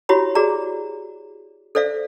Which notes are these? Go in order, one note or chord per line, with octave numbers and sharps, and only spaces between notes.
E4 F#4 G4 C#5 B5
F#4 G#4 D5 A#5
A4 C5 D5 E5 F5